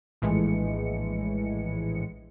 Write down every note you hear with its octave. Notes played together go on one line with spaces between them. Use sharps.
A#1 A2 E3 G#3 C#7